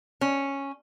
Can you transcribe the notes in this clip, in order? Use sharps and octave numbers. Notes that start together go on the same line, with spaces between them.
C#4